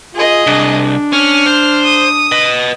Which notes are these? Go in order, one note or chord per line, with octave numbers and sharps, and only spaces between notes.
F4 G#4 D#5
C2 D4
C#4 F6
C5
D#6
B4 D#5